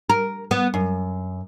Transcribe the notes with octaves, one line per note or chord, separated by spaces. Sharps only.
A#4
B3
F#2